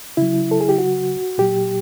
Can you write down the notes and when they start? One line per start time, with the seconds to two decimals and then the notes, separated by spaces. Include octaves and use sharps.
0.17 C#3 F#3 E4
0.51 A4
0.61 G#4
0.69 G4
0.78 F#4
1.38 A#2 F#3 G4